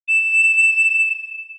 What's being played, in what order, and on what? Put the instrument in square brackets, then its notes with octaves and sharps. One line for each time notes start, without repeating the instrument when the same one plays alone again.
[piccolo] E7